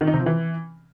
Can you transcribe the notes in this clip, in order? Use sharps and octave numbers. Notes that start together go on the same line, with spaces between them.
D#3
D#4
C3
F3
E3